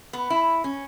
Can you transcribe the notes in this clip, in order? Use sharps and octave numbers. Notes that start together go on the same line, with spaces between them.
B3
E4
C#4